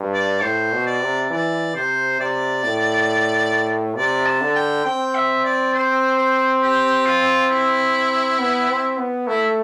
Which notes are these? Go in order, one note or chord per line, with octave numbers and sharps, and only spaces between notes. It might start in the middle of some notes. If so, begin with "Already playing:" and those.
Already playing: G2
D5
A2 C5
B2
D5
C3
E3 D5
C3 C5
C3 D5
A2
C3 D5
A5
D3
G5
C4 G5
E5
D5
C5
C5
G4
F4
E4
B3
C4
B3
A3 E4